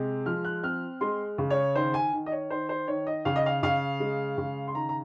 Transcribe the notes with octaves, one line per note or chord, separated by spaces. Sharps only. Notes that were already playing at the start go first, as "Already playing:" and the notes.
Already playing: C3 G#3
F3 F6
F#6
C4 F6
G#3 C6
C#3
C#5
D#3 C5
G#5
D#3
D#5
C#5
D#3 C5
C5
D#3 C#5
D#5
C#3 F5
D#5
F5
C#3 F5
G#3
C#3
C6
D#3 A#5
A#5